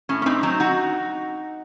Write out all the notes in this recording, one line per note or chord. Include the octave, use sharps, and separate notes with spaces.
A2 C#4
C#4
C4 D#4
F#3 C4 D#4
D#4 F#4